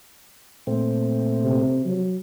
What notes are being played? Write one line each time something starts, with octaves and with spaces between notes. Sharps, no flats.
A#2 A3 C4
C3
F#3